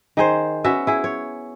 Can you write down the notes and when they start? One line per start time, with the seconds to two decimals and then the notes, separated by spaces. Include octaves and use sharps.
0.17 D#3 G#4 C5
0.64 B3 C#4 F#4 E5
0.87 E4 G#4
1.04 C#5